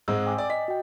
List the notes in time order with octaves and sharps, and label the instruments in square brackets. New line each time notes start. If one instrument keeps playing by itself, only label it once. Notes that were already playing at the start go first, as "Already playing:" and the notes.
[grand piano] G#2 G#3 C4 [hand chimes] E6
[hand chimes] G5 G#5 D6
[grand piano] D5
[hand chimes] D#5 [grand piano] B6
[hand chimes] F#4 G5